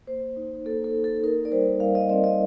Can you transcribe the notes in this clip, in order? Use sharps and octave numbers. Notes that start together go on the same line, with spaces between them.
A#3 C5
D#4
A#3 A4
A4
D#4
A4
D#4 A#4
D5
G3 C5
G3 F5
D#5
C4 D5
D#5